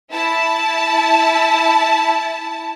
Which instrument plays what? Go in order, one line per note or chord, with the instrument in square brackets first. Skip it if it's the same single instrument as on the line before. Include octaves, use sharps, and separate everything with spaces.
[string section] E4 A5